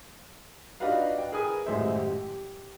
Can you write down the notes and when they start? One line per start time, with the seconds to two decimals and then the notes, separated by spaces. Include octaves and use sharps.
0.80 D4 D#4 F4 F#4 B4 F5
1.18 G5
1.32 G#4 A#4 B4 G#5 D#6
1.66 D#1 F#2 A2 G#3 C5 E5
1.95 G4